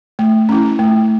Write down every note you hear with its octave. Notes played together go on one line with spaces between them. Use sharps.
A3
C#4 E4
A3